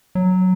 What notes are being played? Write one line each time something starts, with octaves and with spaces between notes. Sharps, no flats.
F#3